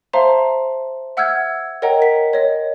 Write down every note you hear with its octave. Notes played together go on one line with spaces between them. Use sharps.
C5 E5 F5 A5 A#5 C6
E5 F#5 E6 F6 G6 G#6
A#4 C#5 D#5 F#5 G5 A#5
B6
C#5 D#5